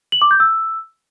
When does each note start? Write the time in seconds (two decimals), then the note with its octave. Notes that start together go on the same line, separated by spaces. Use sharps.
0.12 F#7
0.22 D6
0.31 G6
0.40 E6